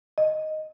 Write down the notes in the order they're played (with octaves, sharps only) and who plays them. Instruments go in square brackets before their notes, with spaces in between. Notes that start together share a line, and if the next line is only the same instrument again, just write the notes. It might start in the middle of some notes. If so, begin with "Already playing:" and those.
[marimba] D#5